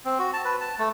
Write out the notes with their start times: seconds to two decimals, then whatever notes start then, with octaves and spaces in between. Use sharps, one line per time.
0.05 C4
0.19 F#4
0.33 A5
0.45 B4
0.61 A5
0.79 A3